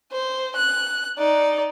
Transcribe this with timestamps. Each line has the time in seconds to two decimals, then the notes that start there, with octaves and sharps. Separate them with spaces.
0.12 C5
0.56 F#6
1.18 D#4 D5